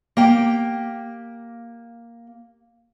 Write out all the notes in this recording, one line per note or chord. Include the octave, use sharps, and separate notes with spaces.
A#3 G4 G5